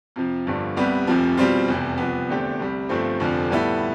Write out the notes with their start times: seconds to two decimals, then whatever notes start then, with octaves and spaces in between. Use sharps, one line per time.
0.16 F2 C3 F3
0.47 G1 G2 D3 F3
0.77 C2 C3 G3 B3
1.07 F1 F2 C3 F3
1.37 B2 G3 C4 F4
1.68 F1 E2 C3
1.98 C2 C3 F3 B3
2.29 E2 D3 A3 C4 G4
2.59 C2 C3 G3
2.89 G1 G2 F3 A3 C4
3.20 F1 F2 D3 F3
3.50 A2 G3 B3 E4 A4